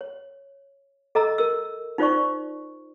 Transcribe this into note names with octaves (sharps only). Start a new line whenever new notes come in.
C#5
A4 D#5 A#5 E6
A#4 E6
D#4 F4 C5 D5 C#6